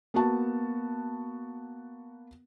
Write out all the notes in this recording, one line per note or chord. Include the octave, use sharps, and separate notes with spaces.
A#3 B3 F#4 A5